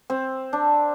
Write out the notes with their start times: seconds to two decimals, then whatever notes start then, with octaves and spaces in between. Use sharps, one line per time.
0.10 C4
0.53 D4